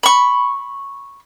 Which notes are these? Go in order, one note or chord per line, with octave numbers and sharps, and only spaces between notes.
B5 C#6